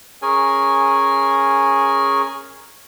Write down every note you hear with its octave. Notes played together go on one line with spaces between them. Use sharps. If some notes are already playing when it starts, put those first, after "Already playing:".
C#4 G#4 A#4 G#5